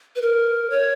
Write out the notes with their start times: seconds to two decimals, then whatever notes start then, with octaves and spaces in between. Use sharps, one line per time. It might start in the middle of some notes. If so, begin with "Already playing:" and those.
0.16 B4
0.22 A#4
0.70 C#5